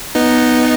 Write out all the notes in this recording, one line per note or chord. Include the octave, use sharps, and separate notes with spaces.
B3 D#4